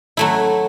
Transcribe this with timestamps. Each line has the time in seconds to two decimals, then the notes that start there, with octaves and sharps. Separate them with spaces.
0.17 F#3 A3 E4